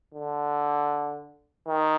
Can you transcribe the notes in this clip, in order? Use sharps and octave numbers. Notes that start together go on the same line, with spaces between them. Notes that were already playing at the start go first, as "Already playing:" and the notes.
D3
D#3